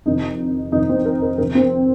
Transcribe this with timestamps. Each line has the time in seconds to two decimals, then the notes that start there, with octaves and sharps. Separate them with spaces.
0.06 F2 C3 D#3 D#4
0.72 F2 C3 D#3 D#4
0.89 C4
1.06 A#4
1.22 A#4
1.38 F2 C3 D#3 A#4
1.55 C4